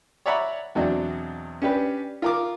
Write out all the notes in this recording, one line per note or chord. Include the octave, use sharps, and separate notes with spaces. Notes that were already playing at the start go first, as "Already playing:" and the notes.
C#5 D5 E5 F#5 A#5 B5
E2 B2 F#3 C4 D4
C#4 D4 G4 B4
F4 A#4 D6